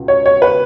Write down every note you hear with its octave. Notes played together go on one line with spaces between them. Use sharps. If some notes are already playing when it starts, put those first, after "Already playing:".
Already playing: C#2 B2
C#5
C#5
B4